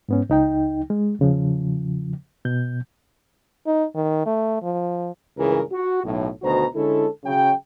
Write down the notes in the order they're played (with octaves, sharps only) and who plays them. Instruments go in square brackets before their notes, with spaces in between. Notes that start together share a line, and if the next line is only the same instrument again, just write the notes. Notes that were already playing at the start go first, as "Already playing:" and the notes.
[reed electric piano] G#2 B3 C#4
C#2 D#4 G5
G#3
E2 C#3 F3
B2 G6
[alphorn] D#4
D#3
A3
F3
[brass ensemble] C#2 G2 C#3 E3 G#4 A#4
F#4
B1 A2
D2 B2 D#3 F#4 C5 A#5
D3 G#3 C#4 E4 A4
C#3 F#3 G5